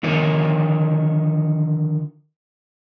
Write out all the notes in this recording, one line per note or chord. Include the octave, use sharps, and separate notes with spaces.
D3 D#3 F3 D#4 A#4 C#5